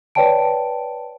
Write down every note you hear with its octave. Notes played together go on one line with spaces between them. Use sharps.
B4 C#5 D5 G5 A5 D7